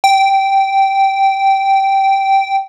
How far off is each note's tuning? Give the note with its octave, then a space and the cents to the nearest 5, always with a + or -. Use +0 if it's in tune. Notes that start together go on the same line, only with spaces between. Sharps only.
G5 -10